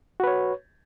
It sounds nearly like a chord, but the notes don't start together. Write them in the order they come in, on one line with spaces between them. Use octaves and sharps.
F#4 B4 C#5